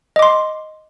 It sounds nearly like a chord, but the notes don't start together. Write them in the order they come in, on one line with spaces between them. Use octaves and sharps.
D#5 D6 C6